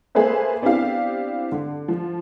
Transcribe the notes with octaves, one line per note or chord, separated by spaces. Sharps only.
A#3 G#4 A4 B4 C5 E5
B3 C4 D4 E4 G4 F5
D3
F3